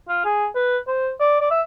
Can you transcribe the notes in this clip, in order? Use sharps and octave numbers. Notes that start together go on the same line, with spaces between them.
F4
G#4
B4
C5
D5
D5
E5